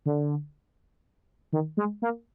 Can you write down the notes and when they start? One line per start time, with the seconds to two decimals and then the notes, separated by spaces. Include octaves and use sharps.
0.06 D3
1.53 D#3
1.77 G#3
2.02 A#3